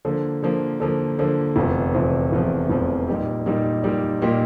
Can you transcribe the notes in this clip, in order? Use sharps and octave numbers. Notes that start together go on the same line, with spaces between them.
D3 F3 A#3
D3 F3 A#3
D3 F3 A#3
D3 F3 A#3
F1 E2 C3 F3
F1 E2 C3 F3
F1 E2 C3 F3
F1 E2 C3 F3
A#2 G3 A#3 D#4 G4
A#2 G3 A#3 D#4 G4
A#2 G3 A#3 D#4 G4
A#2 G3 A#3 D#4 G4